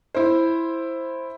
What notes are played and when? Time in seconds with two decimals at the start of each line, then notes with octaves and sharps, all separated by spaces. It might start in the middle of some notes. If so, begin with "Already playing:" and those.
0.15 E4 C5